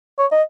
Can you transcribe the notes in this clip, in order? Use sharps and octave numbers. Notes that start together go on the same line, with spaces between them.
C#5
D#5